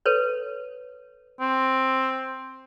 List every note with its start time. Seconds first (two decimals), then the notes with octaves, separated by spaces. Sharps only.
0.06 A4 B4 C#5
1.40 C4